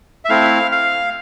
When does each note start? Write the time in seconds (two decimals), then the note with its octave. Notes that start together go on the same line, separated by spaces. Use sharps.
0.25 E5
0.29 A3 C4 E4 F5
0.72 F5